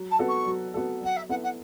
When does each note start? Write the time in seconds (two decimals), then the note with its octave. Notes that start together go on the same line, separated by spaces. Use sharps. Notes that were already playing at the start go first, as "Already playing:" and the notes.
Already playing: F#3
0.10 A5
0.19 B3 F#4 A4
0.28 C#6
0.47 F#3
0.74 B3 F#4 A4
1.02 F#3 F#5
1.16 E5
1.29 B3 E4 A4 F#5
1.43 F#5